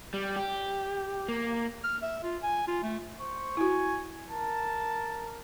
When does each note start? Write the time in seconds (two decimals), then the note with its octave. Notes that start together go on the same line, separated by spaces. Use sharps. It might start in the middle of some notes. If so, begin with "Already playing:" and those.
0.14 G3
0.36 G4
1.29 A#3
1.84 F6
2.02 E5
2.23 F4
2.43 G#5
2.67 F4
2.83 A3
3.20 C5 C#6
3.57 E4 F#4 G#5
4.30 A#4 A5